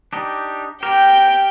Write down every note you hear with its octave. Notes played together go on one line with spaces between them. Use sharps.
D4 D#4 G4
G4 A#4 G5